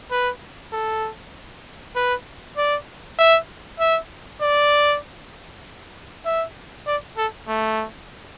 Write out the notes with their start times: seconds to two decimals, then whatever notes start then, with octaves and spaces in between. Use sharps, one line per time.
0.11 B4
0.73 A4
1.96 B4
2.57 D5
3.18 E5
3.79 E5
4.41 D5
6.26 E5
6.87 D5
7.17 A4
7.48 A3